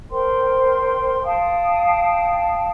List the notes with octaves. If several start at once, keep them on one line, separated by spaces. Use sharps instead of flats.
A#4 C5 G5 C6
F5 G5 A5 D#6